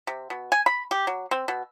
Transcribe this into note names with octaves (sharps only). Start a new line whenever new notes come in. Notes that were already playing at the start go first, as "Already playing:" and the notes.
C3
B2
G#5
B5
G4
F#3
C4
B2